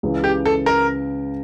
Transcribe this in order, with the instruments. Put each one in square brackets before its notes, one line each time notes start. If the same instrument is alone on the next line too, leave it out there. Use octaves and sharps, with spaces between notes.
[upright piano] C#2 C#3 E3
[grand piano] G4
A4
A#4